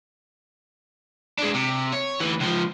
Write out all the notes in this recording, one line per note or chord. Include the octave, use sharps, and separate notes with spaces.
G#3 D4
C3
C#5
D2 E3
C#2 F3